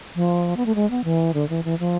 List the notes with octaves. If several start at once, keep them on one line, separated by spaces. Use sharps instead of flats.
F3
B3
A3
G#3
B3
E3
D3
E3
E3
F3